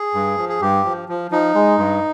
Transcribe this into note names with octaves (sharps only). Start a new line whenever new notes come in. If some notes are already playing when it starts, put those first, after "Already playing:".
Already playing: G#4
G2
F3
G#4
G2 G4
F3
F3
F3 D#4
G#3
G2